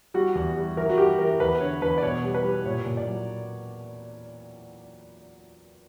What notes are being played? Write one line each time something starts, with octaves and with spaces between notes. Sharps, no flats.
G3 F#4
E2
G3
E3 A#4
F#4
G3 G4
E3 A#4
E2 B4
D3 C#5
E2 B4
D5
B2 C#5
G3
B4
G3
A#2 C#5
A#2
D5
F#3